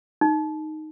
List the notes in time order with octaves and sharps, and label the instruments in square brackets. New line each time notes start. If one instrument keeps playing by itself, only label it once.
[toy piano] D#4